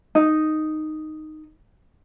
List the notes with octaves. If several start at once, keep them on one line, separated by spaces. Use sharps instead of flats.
D#4